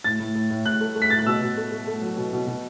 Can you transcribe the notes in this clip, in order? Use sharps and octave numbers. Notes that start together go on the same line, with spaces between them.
A2 A6
A2
A2
A2
A2 F#6
A3
A3
B6
A2 A6
F#6
B2 E6
B2
A3
A3
A3
F#3
B2
B2
B2